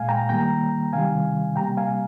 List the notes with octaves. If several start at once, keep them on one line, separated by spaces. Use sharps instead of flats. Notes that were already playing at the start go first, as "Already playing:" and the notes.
Already playing: A#2 G#3 F5 G#5
G5 A#5
D#3 G3 A#3 G5 A#5
C3 D#3 G3 F5 G#5
C3 G3 A#3 G5 A#5
F5 G#5